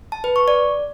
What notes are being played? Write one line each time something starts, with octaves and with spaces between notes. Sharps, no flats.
A5
B4
C#6
D5